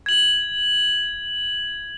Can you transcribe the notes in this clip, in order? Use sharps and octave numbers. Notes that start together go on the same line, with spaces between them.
G#6 F#7